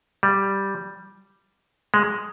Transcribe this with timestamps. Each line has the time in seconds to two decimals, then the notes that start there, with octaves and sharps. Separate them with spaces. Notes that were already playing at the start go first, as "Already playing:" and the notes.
0.23 G3
1.94 G#3